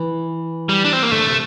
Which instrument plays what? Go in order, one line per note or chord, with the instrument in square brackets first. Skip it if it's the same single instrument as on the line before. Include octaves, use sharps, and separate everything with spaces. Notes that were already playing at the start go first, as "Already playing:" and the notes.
Already playing: [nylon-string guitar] E3
[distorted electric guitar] G3
D4
C4
A#3
[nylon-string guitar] D3 [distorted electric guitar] A3
[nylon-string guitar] C3